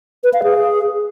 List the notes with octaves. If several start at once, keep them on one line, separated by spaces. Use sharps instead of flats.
B4
F5
G#4